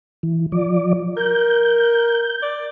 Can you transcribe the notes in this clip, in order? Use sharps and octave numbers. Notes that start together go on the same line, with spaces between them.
E3
F3 D5
A#4 G6
D5